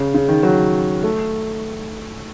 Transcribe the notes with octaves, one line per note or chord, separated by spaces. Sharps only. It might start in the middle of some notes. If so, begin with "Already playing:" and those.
Already playing: C#3
C#3
D#3
F#3
A3